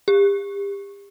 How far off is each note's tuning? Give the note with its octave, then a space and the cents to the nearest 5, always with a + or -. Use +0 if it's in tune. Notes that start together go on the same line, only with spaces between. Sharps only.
G4 +35